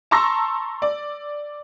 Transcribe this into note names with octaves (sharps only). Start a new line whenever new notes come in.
A5 A#5 C6 C#6 E6 A#6
D5